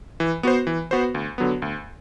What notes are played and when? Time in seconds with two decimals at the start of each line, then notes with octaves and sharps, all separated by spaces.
0.20 E3
0.43 B3 F#4 C5
0.67 E3
0.91 B3 F#4 C5
1.15 D2
1.38 D3 F#3 B3
1.62 D2